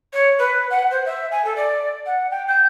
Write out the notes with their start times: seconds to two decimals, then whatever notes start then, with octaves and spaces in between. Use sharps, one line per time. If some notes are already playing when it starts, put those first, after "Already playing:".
0.13 C#5
0.38 B4
0.70 F#5
0.90 C5
1.05 E5
1.31 G#5
1.44 A4
1.56 D5
2.06 F#5
2.31 G5
2.47 G6